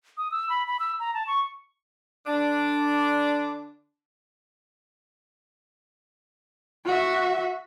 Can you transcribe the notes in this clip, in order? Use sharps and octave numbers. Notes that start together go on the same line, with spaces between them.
D#6
E6
B5
B5
E6
A#5
A5
C#6
D3 D4
F#4 E5